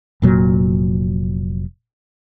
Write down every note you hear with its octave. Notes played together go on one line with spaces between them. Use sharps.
F1 A#2 F#3